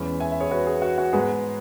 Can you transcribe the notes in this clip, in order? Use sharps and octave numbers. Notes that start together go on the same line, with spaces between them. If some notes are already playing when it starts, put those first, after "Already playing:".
Already playing: E2 E3 G#3 C#4 B5
E5 G#5
E5
G#4 C#5
F#4 B4
G#4
F#4
F#4
G#2 G#3 B3 G#4